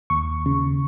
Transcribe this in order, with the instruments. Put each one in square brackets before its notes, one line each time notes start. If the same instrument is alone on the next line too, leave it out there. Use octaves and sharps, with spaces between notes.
[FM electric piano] D#2 C#6
C#3